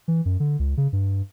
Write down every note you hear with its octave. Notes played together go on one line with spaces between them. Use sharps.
E3
F#2
D3
C#2
C#3
G2